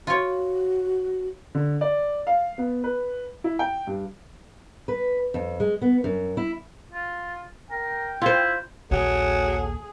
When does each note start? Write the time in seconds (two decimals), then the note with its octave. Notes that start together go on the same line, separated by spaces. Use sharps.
0.07 F4 F#4 C#5
1.55 D3
1.81 D5
2.27 F5
2.58 B3
2.84 B4
3.44 E4
3.59 G5
3.87 G2
4.88 B4
5.34 F2
5.60 G#3
5.82 B3
6.04 F#2
6.37 E4
6.92 F4
7.71 A#4 G5
8.22 E4 F4 C5
8.91 A#1 D#2 F#3 G#4 A4